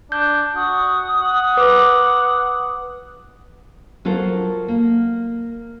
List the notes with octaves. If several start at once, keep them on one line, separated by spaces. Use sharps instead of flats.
D4 G6
F#4 D#6
F#5
B4 D6
F#3 F4 A4 A#4 C5
A#3